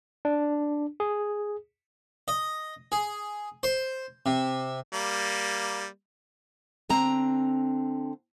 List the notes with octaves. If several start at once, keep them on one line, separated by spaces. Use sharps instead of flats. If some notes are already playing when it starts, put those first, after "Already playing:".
D4
G#4
D#5
G#4
C5
C3
G3 A#3
D3 C4 A#5